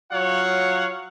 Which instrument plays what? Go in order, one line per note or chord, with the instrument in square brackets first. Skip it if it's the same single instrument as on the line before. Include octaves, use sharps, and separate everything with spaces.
[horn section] F#3 F4 C#5 F5 F#5